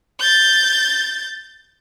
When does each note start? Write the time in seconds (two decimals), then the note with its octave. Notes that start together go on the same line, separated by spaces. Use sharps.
0.20 G6 A6